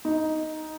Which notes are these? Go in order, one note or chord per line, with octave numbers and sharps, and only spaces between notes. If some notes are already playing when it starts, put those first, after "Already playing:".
D#4